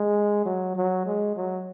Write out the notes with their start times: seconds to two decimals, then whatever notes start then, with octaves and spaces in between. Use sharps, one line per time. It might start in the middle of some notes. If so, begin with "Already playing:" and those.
Already playing: G#3
0.45 F#3
0.76 F#3
1.06 G#3
1.36 F#3